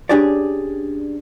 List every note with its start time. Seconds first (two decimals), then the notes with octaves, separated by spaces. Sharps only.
0.09 C#4 D4 G4 G#4 C#5 D5